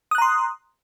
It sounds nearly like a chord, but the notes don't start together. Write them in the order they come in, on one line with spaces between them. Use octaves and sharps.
D#6 F#6 A#5 C6